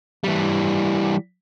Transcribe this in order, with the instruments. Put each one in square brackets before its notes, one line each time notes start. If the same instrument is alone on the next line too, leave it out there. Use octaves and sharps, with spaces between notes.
[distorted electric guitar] E3 G3